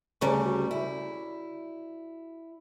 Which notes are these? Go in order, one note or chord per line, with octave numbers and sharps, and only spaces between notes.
D2 C#3 G3 G#4 A#5 C#6
F#4
E4